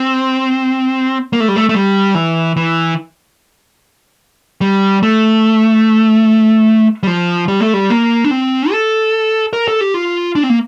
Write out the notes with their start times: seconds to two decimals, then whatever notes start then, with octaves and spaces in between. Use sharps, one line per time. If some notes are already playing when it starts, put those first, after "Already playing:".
Already playing: C4
1.33 A#3
1.40 A3
1.48 G3
1.56 A3
1.69 A3
1.74 G3
2.15 E3
2.57 E3
4.61 G3
5.03 A3
7.03 G3
7.07 F3
7.48 G3
7.60 A3
7.74 G3
7.90 A#3
8.24 D4
8.31 C4
8.71 A4
9.53 A#4
9.68 A4
9.81 G4
9.94 F4
10.35 D4
10.43 C4
10.50 A#3